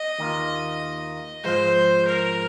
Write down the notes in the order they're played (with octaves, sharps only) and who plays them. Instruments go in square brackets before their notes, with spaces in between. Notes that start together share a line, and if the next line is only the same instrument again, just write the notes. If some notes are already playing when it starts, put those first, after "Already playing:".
Already playing: [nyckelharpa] D#5
[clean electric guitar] D#2 D#3 A#3 F4
[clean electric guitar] G#2 F3 G#3 [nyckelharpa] C5
[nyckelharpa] A#4